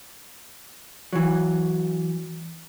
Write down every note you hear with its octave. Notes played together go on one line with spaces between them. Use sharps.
E3 F#3